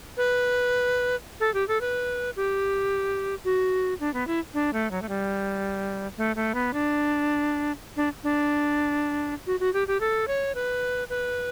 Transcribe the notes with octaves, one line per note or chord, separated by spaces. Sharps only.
B4
A4
G4
A4
B4
G4
F#4
D4
B3
E4
D4
A3
F#3
A3
G3
A3
A3
B3
D4
D4
D4
F#4
F#4
G4
G4
A4
C#5
B4
B4